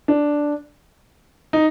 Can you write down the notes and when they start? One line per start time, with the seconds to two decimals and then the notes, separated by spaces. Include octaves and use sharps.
0.08 D4
1.53 D#4